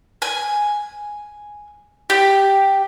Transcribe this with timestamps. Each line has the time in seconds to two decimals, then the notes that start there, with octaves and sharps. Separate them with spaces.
0.22 G#5
2.10 G4